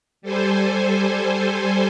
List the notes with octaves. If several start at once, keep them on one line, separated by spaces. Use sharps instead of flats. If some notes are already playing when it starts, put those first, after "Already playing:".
G3 A4 C5 G#5